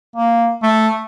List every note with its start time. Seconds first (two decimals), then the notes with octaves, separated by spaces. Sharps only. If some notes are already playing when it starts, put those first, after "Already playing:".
0.16 A#3
0.63 A3